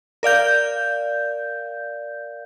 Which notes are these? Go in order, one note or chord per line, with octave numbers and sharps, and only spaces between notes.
A#4 D5 F5 G6